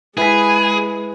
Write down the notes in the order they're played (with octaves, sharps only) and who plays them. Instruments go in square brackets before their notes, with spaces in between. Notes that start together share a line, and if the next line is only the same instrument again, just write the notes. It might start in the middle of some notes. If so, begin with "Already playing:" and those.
[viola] G#3 [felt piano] E4 B6 [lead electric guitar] G#4 [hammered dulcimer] B4 G#5